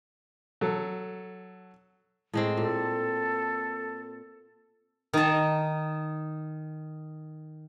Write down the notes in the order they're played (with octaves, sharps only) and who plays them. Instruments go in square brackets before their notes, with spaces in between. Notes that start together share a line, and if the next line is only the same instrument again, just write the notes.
[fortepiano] F#3 A4
[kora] A2 G#3 C4
[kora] A#2 [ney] A4
[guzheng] D#3 A5